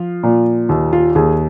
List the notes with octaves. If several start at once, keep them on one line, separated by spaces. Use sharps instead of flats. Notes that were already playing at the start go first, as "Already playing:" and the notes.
Already playing: F3 F4
A#2
D#2
F4
D#2 G#4